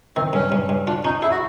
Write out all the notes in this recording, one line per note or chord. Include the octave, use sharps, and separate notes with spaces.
D#3 C4
G2 C#4
G2
G2
D4 F4
C#4 D#4
E4 G#4
F#4